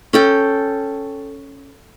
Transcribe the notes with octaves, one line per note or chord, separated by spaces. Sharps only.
C#4 A4 G5